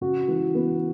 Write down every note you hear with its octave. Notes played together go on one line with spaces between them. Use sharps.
C#3 F#4
E3
B3